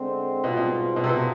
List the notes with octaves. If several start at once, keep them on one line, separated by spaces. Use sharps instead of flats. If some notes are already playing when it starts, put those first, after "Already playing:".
Already playing: D3 G#3 C4
G#2 B2 G3 C4 F4
B2
B2
C3
B2